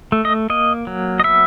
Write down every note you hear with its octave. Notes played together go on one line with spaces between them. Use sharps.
A3
D#5
A#3 D#5
F#3
D#5
B3 E5